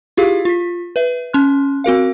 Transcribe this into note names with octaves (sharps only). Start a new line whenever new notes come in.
E4 F4 G4 G#4 F5
F4 B6
B4 E5
C#4 C6 F#6
C4 F#4 A#4 F5